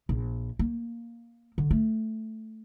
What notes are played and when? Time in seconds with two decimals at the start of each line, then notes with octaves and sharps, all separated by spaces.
0.09 A#1
0.59 A#3
1.58 D3
1.71 A3